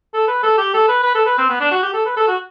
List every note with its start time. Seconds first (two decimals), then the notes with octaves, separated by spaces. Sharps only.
0.14 A4
0.28 B4
0.43 A4
0.58 G4
0.74 A4
0.88 B4
1.03 B4
1.15 A4
1.26 B4
1.38 C4
1.49 B3
1.60 D4
1.71 F#4
1.83 G4
1.94 A4
2.06 B4
2.17 A4
2.28 F#4